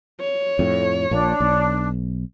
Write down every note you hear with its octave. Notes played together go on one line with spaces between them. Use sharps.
C#5
F2 A2
A#1 A#2 D4
B1